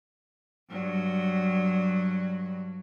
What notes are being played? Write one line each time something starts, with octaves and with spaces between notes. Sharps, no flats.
G2 F#3